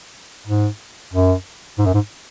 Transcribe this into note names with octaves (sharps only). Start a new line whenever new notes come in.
G#2
F#2
G#2
F#2
G#2